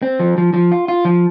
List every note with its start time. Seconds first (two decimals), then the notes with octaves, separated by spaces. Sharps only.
0.02 C4
0.20 F3
0.38 F3
0.54 F3
0.72 F4
0.88 F4
1.05 F3